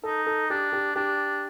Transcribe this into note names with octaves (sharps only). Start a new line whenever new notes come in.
D#4 A4
A4
D4 G4
G4
D4 G4